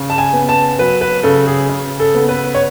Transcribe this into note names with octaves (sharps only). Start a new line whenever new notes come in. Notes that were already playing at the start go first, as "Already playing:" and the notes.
Already playing: C#3
A5
G#5
B3
A5
F#3 B4
B4
C#3 A4
G#4
C#3
A4
B3
B4
C#5